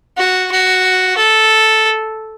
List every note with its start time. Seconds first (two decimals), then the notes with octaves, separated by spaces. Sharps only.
0.18 F#4
0.51 F#4
1.17 A4